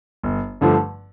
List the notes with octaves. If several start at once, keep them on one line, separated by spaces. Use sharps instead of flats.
G1
G2 D3 F3 A3